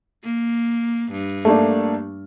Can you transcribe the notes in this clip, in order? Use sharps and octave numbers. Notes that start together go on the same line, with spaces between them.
A#3
G2
A3 A#3 D4